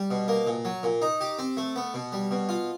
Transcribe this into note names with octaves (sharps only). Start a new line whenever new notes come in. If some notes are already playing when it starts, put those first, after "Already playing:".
Already playing: G3
B2
A#3
A#2
F#3
A#2
D#4
G4
C4
A3
B3
B2
G3
B2
F4